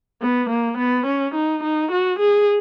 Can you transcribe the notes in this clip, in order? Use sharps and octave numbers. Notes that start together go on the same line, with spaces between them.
B3
A#3
B3
C#4
D#4
D#4
F#4
G#4